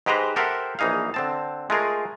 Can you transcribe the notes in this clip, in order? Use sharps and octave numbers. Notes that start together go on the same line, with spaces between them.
G#2 G#3 G4 B4 C5 A#5
G4 A4 A#4 C5 E5 F#5
A#1 E3 D#4 G#4 F5
D3 C4 A5
G#3 A3 F4 G#4 A#4